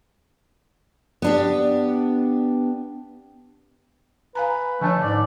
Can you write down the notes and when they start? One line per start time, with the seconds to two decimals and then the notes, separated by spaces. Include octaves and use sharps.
1.22 B3 D4 G4
4.35 B4 F5 G#5 A#5
4.81 D3 F3 A3 D4 C#5 G#5 A5
5.01 G#2 D5